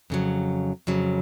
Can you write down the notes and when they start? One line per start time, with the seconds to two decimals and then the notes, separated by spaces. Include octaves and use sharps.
0.10 F2 C#3 F#3
0.87 F2 C#3 F#3